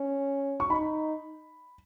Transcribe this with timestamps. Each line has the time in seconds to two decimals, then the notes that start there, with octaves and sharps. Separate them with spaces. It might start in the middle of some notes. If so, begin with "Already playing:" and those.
Already playing: C#4
0.60 C#6
0.70 D#4 B5